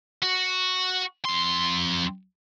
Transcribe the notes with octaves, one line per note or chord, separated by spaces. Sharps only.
F#4
F2 C6